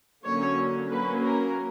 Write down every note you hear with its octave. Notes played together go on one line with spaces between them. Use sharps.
D3 F#3 A#3 C#4 C#5
F#3 A#3 C#4 B4
A#4